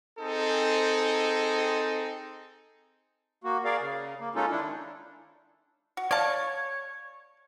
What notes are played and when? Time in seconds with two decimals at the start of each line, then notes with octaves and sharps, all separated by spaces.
0.19 C4 D#4 G#4 A4
3.44 A#3 F#4
3.65 G#4 A#4 D5 F5
3.80 C#3
4.20 A#3
4.35 G#3 C#4 D#4 F4 A4
4.51 D#3 D4 E4
5.97 F#4
6.11 C#5 D5 F5 A5